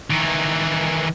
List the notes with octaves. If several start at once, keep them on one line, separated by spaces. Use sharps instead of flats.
D#3 E3